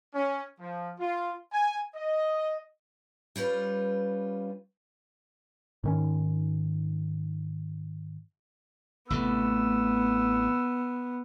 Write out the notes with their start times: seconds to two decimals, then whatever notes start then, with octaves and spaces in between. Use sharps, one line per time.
0.14 C#4
0.60 F3
0.99 F4
1.52 G#5
1.95 D#5
3.36 G3 C#4 F4 B4
5.84 G#2 D#3 C#4
9.10 A1 C3 A3 B3 E6